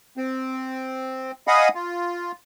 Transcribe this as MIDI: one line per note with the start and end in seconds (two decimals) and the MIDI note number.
0.17 1.31 60
1.47 1.68 75
1.47 1.68 77
1.47 1.68 78
1.47 1.68 80
1.47 1.68 83
1.47 1.68 87
1.75 2.32 65